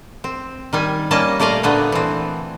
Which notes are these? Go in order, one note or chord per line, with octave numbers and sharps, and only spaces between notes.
C4
D#3 G3 G#5
G3 A#3 C#4 D#5 A5
A#2 A3 D5 D#5 F5
A#2 D3 A3 B3
E3 C4